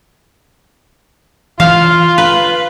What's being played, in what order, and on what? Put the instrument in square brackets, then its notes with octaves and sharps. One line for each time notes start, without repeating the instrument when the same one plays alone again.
[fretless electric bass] E3 [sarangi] F4 [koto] F5
[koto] B4